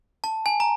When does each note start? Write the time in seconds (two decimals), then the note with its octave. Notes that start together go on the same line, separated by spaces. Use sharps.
0.24 A5
0.46 G#5
0.60 A#5